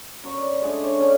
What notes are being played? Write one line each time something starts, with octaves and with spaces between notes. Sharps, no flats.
F#2 C#5 A#5 C#6
D5
G#3 A3 D4 G#4
C#5 D5 C#6
D3 A3 C#4